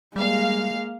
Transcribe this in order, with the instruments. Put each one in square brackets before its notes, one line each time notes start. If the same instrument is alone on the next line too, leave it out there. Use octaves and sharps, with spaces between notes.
[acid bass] G3 [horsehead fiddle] G#3 A#3 [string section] F5